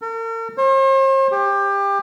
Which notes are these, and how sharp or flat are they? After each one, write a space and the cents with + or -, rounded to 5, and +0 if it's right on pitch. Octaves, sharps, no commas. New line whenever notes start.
A#4 -45
C5 +45
G4 +25